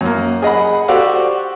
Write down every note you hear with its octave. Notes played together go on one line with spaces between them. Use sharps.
F#2 A#3
G#4 D#5 F#5 B5
F#4 G4 A4 C5 D5 F5